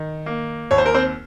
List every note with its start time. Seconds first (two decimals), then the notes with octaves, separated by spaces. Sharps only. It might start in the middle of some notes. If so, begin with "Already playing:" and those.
Already playing: D#3
0.26 A#3
0.71 D#2 C#5
0.78 C5
0.86 A#4
0.94 C4 C5